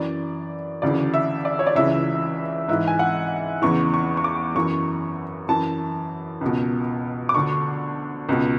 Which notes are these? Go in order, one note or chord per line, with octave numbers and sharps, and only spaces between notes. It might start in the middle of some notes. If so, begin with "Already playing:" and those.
Already playing: F#2 E3 D5
D2 C#3 E3 D5
E5
D5
C#5
D5
C#2 C#3 E3 E5
G#2 E3 E5
G#5
F#5
E2 C#3 E3 C#6
C#6
C#6
D6
F#2 E3 C#6
F#2 E3 A5
C#2 B2
D6
D2 D3 C#6
C#2 B2